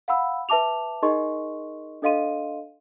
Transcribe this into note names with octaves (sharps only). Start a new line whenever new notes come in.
F5 F#5 B5 E6
B4 E5 A5 D6 F7
D#4 G#4 A#4 D#5 C6 C#6
D4 A4 D#5 F5 C6 D#7